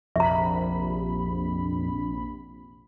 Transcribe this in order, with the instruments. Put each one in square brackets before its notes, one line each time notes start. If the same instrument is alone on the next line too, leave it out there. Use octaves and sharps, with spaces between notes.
[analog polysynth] A#1 C3 B5 [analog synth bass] F2 [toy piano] E5 A#5